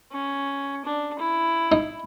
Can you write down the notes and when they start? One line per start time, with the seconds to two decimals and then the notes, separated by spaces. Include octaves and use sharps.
0.12 C#4
0.85 D4
1.19 E4
1.72 D#4